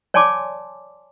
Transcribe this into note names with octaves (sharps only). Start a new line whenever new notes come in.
C#5 D5 G#5 A5 C6 D6